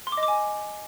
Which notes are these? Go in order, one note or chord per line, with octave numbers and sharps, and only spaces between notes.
C6
D6
D#5
D6
G#5